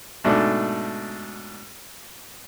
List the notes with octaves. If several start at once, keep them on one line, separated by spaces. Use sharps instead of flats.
G#2 B2 A3 D4